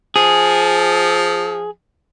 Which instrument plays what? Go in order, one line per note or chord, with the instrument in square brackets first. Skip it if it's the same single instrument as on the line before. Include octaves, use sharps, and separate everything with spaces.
[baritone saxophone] F3 [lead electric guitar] G#4